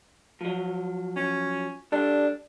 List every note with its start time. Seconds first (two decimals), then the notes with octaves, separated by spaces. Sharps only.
0.41 F3 F#3
1.16 C#4
1.92 G3 D4 A4